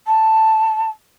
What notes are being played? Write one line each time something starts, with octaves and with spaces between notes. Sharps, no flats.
A5